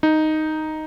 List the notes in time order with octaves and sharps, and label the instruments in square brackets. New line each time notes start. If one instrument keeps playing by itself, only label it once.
[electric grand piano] D#4